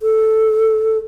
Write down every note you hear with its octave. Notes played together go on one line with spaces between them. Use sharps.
A4